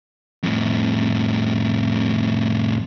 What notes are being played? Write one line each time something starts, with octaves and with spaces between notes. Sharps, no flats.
F2 A2